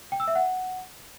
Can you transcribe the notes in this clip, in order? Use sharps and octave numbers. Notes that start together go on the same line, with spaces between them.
G5
E6
E5
F#5